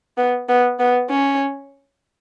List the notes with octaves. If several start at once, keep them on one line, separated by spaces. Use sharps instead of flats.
B3
B3
B3
C#4